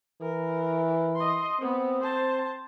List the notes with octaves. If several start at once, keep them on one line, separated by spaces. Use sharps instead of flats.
E3 A#4
D#5 C6
B3 C4
C5 A5